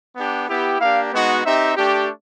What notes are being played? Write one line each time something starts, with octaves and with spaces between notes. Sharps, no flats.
B3 D4 G4
B3 E4 G4
A#3 D4 G4 F5
G#3 B3 D#4 F#4
C4 D#4 G4 E5
A3 D4 G4